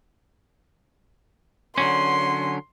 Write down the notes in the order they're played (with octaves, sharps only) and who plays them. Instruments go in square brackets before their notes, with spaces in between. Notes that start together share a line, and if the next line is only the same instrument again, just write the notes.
[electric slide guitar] D3 F#3 C#4 [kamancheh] C6